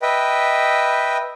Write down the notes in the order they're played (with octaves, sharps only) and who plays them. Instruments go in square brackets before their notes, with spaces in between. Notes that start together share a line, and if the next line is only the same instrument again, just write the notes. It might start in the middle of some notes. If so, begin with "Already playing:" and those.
[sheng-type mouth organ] B4 D#5 E5 G5